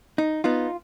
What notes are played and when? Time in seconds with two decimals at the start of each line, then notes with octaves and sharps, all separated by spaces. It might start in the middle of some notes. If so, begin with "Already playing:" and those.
0.18 D#4
0.44 B3 D#4 F4